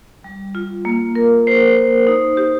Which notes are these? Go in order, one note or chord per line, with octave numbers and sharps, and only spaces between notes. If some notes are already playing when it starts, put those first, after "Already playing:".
G3
F4
A#3
A#4
C5
C5
D#4
G4